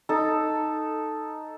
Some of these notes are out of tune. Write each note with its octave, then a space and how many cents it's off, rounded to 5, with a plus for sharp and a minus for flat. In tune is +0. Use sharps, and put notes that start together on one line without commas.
D#4 +0 A4 +0